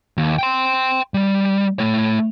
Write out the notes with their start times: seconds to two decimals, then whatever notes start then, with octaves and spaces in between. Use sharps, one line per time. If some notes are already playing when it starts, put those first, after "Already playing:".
0.18 D#2
0.38 G5 C6
1.14 G3
1.79 A3 C#5